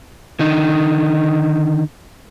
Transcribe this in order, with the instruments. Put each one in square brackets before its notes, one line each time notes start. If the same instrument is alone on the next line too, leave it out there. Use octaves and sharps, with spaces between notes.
[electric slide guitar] D3 D#3 D#4